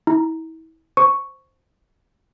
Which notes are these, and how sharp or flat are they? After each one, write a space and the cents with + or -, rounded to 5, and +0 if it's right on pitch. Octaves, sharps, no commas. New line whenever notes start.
E4 -35 A#5 +0
C5 +0 C#6 +0